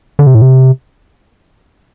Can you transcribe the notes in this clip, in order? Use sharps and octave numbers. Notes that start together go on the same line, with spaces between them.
D3
C3
A2
C3